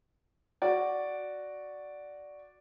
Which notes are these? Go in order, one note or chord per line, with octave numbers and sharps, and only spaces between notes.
F#4 D5